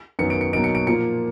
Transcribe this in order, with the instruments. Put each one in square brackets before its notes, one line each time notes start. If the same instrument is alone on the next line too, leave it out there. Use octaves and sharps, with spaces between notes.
[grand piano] F#2 D#3 F#3 B3 C#7
D7
C#7
B2 F#3 A#3 D#4 D7
C#7
D7
A#2 F3 A#3 C#7